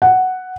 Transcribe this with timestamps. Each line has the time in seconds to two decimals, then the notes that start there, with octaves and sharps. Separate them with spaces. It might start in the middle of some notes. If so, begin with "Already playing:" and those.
0.02 F#5